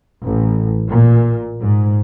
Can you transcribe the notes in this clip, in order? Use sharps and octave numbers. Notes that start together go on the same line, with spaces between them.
A1
A#2
G#2